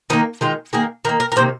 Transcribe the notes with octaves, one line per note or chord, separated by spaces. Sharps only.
D#3 A#3 D#4
D#3 G#3 F4
D#3 A#3 G#4
D#3 A#3 A#4
A#4
A#4
C3 D#3 A#3 C5